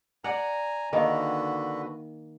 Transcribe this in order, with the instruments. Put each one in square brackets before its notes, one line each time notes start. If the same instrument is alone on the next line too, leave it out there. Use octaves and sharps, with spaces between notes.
[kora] D5 F#5 [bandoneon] G#5 A#5
[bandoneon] D3 F#4 B4 [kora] D#3 A#3